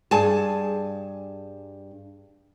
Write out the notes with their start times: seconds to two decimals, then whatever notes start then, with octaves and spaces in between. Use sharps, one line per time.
0.11 G2 G#4 G#5 A5